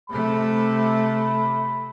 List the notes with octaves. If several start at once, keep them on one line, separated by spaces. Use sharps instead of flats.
C3 A3 B5